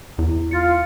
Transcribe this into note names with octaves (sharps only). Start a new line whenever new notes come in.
E2 E4
F4 A6 C#7